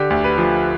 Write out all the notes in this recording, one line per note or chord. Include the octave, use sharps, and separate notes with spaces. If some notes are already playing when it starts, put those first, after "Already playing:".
Already playing: D3 G4
D2
B4
F3